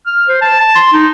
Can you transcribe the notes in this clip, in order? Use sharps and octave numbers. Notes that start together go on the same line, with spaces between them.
F6
C5
A5
A5
C6
D#4